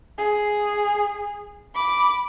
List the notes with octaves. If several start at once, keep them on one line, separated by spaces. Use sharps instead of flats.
G#4
B5 D6